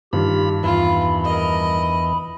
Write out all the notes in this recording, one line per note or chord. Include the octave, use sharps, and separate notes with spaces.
G2 D#3 F4 G4 B5
E2 E3 F4 B5
A#4 D#5